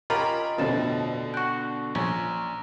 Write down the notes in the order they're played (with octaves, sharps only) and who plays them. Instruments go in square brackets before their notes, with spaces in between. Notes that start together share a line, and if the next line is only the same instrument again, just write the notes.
[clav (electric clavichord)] C#4 F4 G4 [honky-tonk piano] A#4 A#5 B5 [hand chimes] D#5
[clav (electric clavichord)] A1 F2 A5 [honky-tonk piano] B2 D3
[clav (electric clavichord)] F#4 G5 [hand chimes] C#6 F#6
[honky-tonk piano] A#1 [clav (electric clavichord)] C#4 [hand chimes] A#5